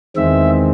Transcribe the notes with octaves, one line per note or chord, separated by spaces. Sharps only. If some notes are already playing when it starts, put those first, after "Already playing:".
E2 D#3 G#3 C4 E5